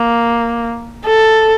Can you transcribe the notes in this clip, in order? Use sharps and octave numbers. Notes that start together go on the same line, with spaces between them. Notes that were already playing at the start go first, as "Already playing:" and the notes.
Already playing: A#3
A4